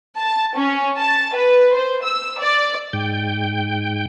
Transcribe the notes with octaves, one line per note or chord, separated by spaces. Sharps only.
A5
C#4
A5
B4
C5
E6
D5
G#2 G5